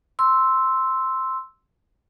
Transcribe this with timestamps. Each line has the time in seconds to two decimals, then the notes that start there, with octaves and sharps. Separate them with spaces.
0.19 C6 E6